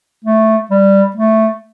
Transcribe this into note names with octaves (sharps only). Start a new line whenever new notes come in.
A3
G3
A3